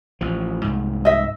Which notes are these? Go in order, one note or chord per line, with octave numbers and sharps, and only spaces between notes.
A1 F3
C2 G#2
D#5 E5